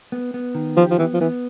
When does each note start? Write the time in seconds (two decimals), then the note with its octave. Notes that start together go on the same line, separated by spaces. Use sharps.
0.12 B3
0.34 B3
0.55 D#3
0.77 F3 G4
0.91 F3
0.98 E3 B3
1.14 F3
1.21 E3 B3